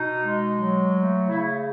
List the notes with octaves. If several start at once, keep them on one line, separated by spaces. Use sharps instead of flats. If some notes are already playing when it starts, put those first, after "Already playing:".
Already playing: B2 D#4
G#3
F#3
A3
C#3 E4